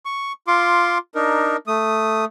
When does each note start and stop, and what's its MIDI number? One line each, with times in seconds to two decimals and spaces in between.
0.05 0.32 85
0.47 0.98 65
0.47 0.98 84
0.47 0.98 86
1.15 1.56 62
1.15 1.56 63
1.15 1.56 70
1.67 2.25 57
1.67 2.25 87